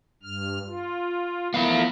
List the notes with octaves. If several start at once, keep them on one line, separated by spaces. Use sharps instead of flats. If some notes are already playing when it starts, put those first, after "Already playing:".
G2 F6
F4
F3 A3 B3 E4 A#4 F5 B5